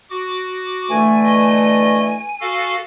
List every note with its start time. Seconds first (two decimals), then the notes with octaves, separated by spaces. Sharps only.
0.10 F#4 D6
0.90 D3 E3 A3 G#5
1.24 D#5
2.41 F#4 A4 F5